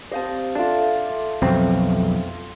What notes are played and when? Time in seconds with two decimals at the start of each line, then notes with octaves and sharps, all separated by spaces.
0.12 C4 G4 C5 D#5 F5 A5
0.55 D4 F4 A4 E5 D6
1.42 B1 F2 C4